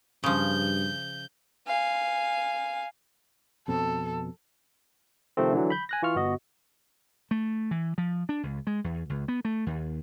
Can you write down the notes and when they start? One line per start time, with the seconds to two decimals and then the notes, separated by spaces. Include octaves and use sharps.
0.24 G2 C#3 F3 G6
1.67 F5 G#5
3.68 F2 B2 C4 A4
5.37 C3 D#3 F3 A3 C4
5.53 D3 E3 F#3
5.70 B5 G6
5.89 G#5 F#6 A#6
6.02 E3 F4 C#6 F6
6.15 G1 B3 F#4 D#5
7.31 A3
7.71 E3
7.98 F3
8.29 D4
8.43 C#2
8.67 G#3
8.84 E2
9.10 C#2
9.28 B3
9.45 A3
9.66 D#2